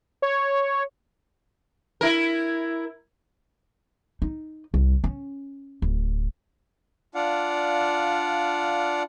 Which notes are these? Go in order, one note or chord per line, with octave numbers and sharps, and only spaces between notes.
C#5
E4 A#4
D#4
C2
C#4
D1
D4 F4 D5 F5 F#5